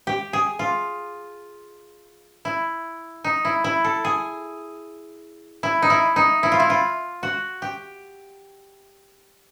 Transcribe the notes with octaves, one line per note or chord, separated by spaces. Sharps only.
G4
G#4
F4
E4
D#4
E4
E4
A4
G#4
E4
D#4
E4
D#4
E4
F4
E4
F4
F#4
G4